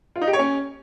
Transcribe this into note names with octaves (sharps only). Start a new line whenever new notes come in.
F4
D#4
G4
C#5
C#4